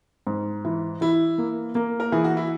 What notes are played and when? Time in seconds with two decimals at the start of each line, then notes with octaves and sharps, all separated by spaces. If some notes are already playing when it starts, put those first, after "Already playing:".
0.27 G#2
0.65 E3
1.01 E3 E4
1.38 A#3
1.75 A#3
2.00 A#4
2.12 E3 G#4
2.24 F#4
2.37 E4